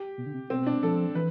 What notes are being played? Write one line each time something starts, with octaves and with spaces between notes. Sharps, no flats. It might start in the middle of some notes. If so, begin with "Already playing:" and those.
Already playing: G4
B2
D3
C3
B2 C4
D4
F3 A4
E3 B4